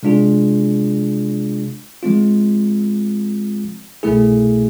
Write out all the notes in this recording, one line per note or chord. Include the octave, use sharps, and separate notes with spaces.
C3 G#3 D4 F4 G#4
F3 G#3 C4 F4
C2 B2 A3 E4 G#4